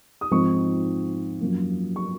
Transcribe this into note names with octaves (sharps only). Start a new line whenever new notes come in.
D#6
G#2 F3 C4 D#4 C#6
F#2 F3 A#3
C#6